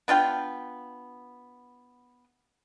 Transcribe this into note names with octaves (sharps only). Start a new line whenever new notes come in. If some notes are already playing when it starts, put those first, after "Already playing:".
B3 D4 F4 G5